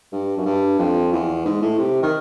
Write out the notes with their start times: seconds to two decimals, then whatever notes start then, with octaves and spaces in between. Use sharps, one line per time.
0.12 G2
0.37 F#2
0.45 G2
0.79 F2
1.13 E2
1.45 G#2
1.62 A2
1.78 C3
2.03 D#3